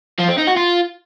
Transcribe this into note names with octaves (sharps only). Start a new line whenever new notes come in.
F3
C4
D#4
F#4
F4